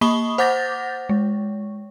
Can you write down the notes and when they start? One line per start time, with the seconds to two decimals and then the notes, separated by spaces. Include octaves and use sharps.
0.01 A#3 B5 C#6 D#6 G7
0.38 C5 F#5 D6 G6 A6 A#6
1.09 G#3